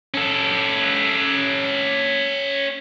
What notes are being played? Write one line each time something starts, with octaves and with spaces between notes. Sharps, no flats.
C#4 A4